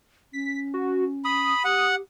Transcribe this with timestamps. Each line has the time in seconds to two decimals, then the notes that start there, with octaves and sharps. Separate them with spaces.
0.33 C#4 B6
0.74 F#4
1.25 B5 D#6
1.65 G4 F#5